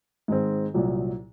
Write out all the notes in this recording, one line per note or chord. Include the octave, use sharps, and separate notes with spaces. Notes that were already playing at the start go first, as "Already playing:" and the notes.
G#2 D#3 G#3 C4
C2 A#2 F#3